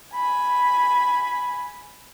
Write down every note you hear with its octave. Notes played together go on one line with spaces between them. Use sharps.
G#5 B5